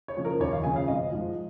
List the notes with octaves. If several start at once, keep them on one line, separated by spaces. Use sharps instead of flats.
C#5
C#3 F3
A#4
D#2 C#5
F5
C#3 F3 G#5
F5
G#1 D#5
G#2 F3